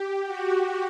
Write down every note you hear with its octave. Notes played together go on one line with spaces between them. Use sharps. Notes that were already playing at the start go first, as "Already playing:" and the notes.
Already playing: G4
F#4